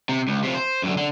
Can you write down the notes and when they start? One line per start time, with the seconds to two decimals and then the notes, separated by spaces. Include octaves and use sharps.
0.09 C3
0.28 C#2
0.44 C3 F3
0.55 C5
0.83 F#2 D3
0.98 D3